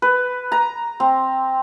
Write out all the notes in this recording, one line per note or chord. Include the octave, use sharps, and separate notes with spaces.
B4
A#5
C4